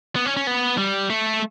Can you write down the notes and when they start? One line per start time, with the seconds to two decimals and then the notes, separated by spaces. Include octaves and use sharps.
0.16 B3
0.26 C#4
0.37 C#4
0.47 B3
0.78 G3
1.10 A3